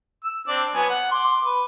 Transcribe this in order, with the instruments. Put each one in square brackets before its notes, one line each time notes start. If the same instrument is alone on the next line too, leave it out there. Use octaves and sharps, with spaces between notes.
[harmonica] E6
C4 D4 D5
F#3 B3 G#5
F#5
C6 D6
B4